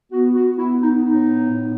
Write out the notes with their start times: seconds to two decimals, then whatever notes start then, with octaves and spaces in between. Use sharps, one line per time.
0.12 B3 F#4
0.35 F#4
0.58 B3 E4
0.81 D#4
1.04 A2 D#4
1.52 A2